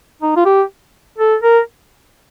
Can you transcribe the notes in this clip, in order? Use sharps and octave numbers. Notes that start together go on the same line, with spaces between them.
D#4
F4
G4
A4
A#4